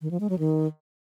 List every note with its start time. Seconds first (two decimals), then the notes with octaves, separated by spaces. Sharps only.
0.02 D#3
0.11 F3
0.20 G#3
0.30 F#3
0.39 D#3